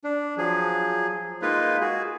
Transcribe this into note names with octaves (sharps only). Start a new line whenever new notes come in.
D4
F3 F#3 G#4
G#3 A#3 D#4 F4 B4
F#4 G#4